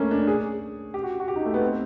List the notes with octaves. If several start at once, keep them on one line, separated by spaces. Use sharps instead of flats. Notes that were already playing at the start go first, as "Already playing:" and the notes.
Already playing: A3 A#3 C#4
D4
G#4
G4
F#4
F#4
G4
D#4
A3
B3
C4